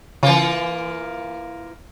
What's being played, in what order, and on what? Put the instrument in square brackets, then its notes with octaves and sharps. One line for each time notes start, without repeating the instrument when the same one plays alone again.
[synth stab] C#3 [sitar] E3 A#3 F4